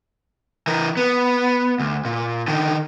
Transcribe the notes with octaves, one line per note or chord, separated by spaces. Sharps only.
E3 A#4
B3
D2
A#2
D3 D#3